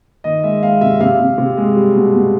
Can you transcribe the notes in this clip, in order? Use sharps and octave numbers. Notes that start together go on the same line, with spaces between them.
D#3 D#5
G#3 E5
G#3 F5
C3 E5
C3 F5
C3
C3
G#3
G3
B2
B2